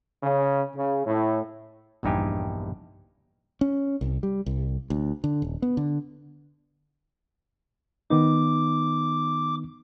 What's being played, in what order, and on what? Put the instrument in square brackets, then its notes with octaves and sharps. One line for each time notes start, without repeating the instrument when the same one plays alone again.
[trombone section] C#3
C#3
A2
[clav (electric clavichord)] A#1 E2 G2 D#4 G4 G#5
[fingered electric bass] C#4
C2
G3
C2
D2
D3
D#1
B3
D3
[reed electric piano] D#3 B3 D#4 [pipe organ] D6